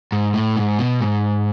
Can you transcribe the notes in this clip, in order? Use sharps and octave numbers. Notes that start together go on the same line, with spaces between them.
G#2
A2
G#2
B2
G#2